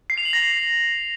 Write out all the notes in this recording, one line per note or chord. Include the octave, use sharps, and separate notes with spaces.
C7
F7
F#7
A#6